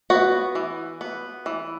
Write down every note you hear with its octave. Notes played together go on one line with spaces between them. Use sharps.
B3 F#4 F#5
E3
B3
E3